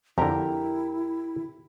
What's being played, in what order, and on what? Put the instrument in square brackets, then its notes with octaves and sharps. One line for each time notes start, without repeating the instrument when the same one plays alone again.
[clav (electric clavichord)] F2 D3 [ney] E4 [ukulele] G4 A#4 A#5